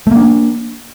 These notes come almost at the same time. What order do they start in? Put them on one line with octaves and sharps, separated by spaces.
A3 A#3 D4